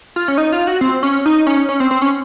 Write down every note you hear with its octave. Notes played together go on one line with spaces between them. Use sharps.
F4
C#4
D#4
F4
F#4
C4
C#4
D#4
C#4
C#4
C4
C4
C#4